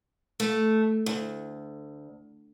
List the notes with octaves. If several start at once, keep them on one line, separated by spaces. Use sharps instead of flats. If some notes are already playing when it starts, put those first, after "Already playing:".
A3
D2